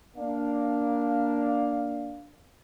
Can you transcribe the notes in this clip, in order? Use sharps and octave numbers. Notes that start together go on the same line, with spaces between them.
A#3 D4 F5